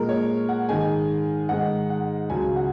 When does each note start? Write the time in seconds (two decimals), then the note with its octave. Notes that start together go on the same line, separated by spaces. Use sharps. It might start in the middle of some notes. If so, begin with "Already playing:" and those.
Already playing: A#2 G#3 A#4
0.09 C#5
0.49 F#5
0.69 G#2 D#3 G#3 G#5
1.49 G#2 D#3 G#3 F#5
1.90 F#5
2.29 C#2 C#3 F#3 G#5
2.56 F#5